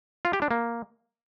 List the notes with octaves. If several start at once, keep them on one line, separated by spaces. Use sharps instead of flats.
F4
G4
D4
A#3